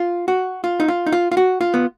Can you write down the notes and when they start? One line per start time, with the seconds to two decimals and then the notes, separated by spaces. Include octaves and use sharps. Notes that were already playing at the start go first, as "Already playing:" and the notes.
Already playing: F4
0.28 F#4
0.64 F4
0.80 D#4
0.88 F4
1.06 D#4
1.12 F4
1.32 F4
1.37 F#4
1.61 F4
1.74 B3